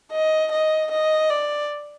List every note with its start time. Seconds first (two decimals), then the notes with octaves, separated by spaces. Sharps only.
0.12 D#5
0.51 D#5
0.91 D#5
1.30 D5